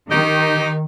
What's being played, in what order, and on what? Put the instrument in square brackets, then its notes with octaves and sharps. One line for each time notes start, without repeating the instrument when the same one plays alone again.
[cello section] D#3 [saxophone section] D#4 G4 D#5